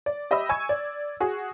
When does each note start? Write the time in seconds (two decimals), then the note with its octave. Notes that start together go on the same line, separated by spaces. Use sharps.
0.06 D5
0.31 G4 D#5 E5 B5 E6
0.49 G#5 C#6 E6 G#6
0.69 D5
1.20 F#4 G#4